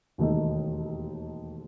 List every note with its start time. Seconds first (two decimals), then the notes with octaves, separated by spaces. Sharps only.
0.18 E1 D#2 D#3 A3 D#4